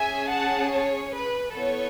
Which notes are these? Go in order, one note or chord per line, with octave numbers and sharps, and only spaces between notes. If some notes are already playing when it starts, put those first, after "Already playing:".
Already playing: C#4 G#4 E5 G#5
F#5 A5
C#5
B4
B3 E4 A4 C#5